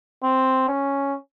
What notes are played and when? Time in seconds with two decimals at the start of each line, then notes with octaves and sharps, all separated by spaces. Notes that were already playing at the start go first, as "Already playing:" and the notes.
0.23 C4
0.68 C#4